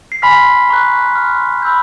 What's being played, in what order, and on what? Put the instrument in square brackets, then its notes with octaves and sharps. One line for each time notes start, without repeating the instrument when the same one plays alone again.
[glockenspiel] C7
G#5 B5 C6 F6 B6
A#5 C#6 F#6
C6 F6
B5 E6 G6